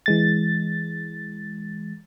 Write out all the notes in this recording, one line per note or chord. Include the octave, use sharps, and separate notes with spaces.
E3 G#3 A6